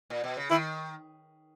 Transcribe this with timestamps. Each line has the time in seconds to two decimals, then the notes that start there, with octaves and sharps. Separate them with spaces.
0.10 A#2
0.24 B2
0.37 C#3
0.51 D#3 E4